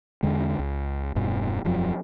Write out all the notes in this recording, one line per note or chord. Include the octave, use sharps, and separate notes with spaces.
E2 D3 G#3
C#2
E1 G2 B2
E1 F#2 F3 F#3